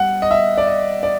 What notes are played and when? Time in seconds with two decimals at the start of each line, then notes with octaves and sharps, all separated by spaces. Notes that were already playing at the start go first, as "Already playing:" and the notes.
Already playing: G3 F#5
0.22 D#5
0.31 E5
0.57 D5
0.67 D#5
1.03 D5